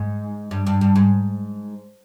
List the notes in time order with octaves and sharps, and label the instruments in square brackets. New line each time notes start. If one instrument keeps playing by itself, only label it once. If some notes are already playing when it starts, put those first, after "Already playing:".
Already playing: [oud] G#2
G2
G2
G2
G#2